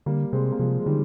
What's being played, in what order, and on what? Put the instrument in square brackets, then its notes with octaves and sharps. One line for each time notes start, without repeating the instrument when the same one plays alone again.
[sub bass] D3 [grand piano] G3 A#3
[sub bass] C3 [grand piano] G#3 C4
[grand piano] A#3
[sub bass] C3 [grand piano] F3 G#3
[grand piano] G#3
[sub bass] D3 [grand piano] D#3 G3